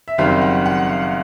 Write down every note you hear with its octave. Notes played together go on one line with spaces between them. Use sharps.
E5
F#1 F#2 D#3 G3 C4 F5
F#5
F#5
F5